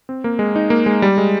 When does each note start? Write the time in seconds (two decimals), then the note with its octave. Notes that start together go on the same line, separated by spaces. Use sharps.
0.09 C4
0.24 A#3
0.39 G#3
0.56 D#4
0.70 A#3
0.86 G#3
1.02 G3
1.18 G#3